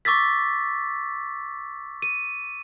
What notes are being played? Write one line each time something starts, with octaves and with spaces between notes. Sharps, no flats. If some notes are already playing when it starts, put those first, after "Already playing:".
C#6 D6 E6 A6 B6
D#7